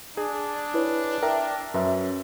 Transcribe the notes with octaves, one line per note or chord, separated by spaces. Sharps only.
D4 G#4
E4 B4 C#5
A#4 E5 G5 A#5
F#2 C#4 B4 E5